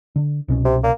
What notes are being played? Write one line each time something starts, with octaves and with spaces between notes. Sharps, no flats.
D3
C2 B2 C#4
C3
A#3